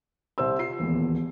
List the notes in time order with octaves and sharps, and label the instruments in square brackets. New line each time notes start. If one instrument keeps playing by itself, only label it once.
[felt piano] C2 C5 E6
[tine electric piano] F4 [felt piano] C7
[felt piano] D#1 E2 [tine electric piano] D#3 E3 A#3